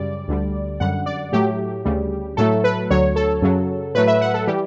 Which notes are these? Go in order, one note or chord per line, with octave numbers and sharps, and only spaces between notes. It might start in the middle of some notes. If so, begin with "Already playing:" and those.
Already playing: F#2 C#3 G3 D5
D2 D3 G3
F#2 D3 G3 F#5
D5
A2 F#3 A3 G4
D2 C#3 G3
A2 F#3 A3 A4
B4
D2 D3 F#3 C#5
A4
F#2 C#3 F#3
A2 F#3 A3 B4
E5
F#5
A4
E3 G3 G4